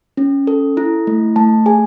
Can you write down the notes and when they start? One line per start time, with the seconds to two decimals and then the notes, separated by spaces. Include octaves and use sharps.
0.17 C#4
0.47 A4
0.77 E4
1.07 A3
1.36 A3 A5
1.66 G#4 G#5